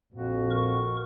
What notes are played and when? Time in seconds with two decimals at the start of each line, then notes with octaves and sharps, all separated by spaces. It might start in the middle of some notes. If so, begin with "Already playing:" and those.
0.14 A#1 F2 F#4
0.51 A#4 C#6